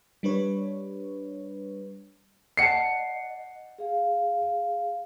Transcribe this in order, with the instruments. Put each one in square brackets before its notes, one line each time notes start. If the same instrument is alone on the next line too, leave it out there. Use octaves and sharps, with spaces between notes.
[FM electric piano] G3 D4 B4 C#5
[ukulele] D5 F#5 A5 [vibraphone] D#5 [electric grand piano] C7 C#7
[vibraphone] G#4 F5